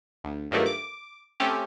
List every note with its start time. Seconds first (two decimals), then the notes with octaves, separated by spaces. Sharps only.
0.24 D2
0.51 G2 D#3 F3 F#3 A3 A#3
0.66 D6
1.40 A3 C4 C#4 G4